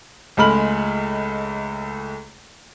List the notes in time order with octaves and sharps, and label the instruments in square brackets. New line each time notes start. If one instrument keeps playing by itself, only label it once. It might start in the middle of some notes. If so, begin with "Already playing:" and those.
[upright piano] C#2 G#3 A3 B5 F6 F#7